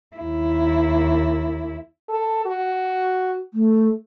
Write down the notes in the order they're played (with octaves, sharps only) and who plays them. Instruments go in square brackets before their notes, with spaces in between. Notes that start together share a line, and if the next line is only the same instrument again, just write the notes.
[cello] D#2 E4
[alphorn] A4
F#4
[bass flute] A3